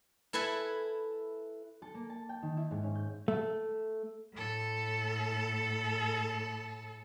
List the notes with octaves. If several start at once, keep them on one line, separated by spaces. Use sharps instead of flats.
E4 A4 B4 E5 G#5
A4
A#3
A5
G5
D#3
E4
G#2
C#4
G6
A3
A2 A4